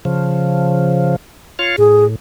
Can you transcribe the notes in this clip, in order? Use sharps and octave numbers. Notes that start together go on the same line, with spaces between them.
C#3 F3
F4 C#5 F5
A2 G#4